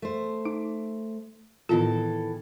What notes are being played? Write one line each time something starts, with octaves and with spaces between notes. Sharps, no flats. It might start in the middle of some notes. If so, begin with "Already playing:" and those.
A3 C5
D#4
A2 D#3 E3 B3 F4 A4